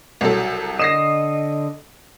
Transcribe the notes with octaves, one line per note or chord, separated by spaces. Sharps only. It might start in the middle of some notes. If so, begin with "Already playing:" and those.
C2 F#3 A4
D3 D#5 A#6 C7 E7